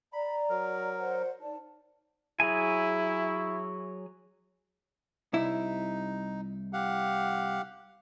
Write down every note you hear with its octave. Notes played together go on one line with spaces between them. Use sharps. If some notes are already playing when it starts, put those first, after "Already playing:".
D5 A#5 B5
F#3 A#4
C5 D5 F#5
D#4 D5 A5
F#3 E4 G#4 G#5
C2 D#4 E4
G4 F5 F#5